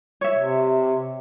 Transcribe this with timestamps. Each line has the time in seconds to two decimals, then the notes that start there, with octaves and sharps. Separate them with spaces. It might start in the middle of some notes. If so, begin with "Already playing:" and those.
0.21 C#5 E5
0.38 C3